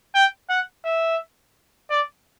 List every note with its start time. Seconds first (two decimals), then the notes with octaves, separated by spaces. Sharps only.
0.15 G5
0.50 F#5
0.85 E5
1.90 D5